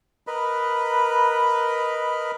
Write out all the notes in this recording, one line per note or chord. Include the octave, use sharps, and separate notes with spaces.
A#4 B4 D#5 B5